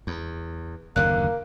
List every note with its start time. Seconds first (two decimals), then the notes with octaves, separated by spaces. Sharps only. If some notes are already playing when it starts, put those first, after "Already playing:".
0.07 E2
0.96 F#1 D#2 D3 A#3 F#6